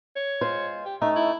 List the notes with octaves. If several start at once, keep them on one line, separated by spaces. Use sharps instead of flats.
C#5
G#3 F4 C5
G4
A3 C#4 D#4 E5
E4